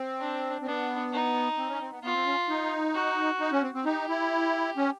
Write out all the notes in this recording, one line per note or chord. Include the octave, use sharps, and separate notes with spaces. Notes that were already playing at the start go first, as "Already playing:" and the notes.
Already playing: C4
D4
C4
B3 D4
D#4
C4
C#4
C4
B3
B3 F4
C4
C#4
D#4
F#4
D#4
C#4
C4
C4
D#4 G4
E4
C#4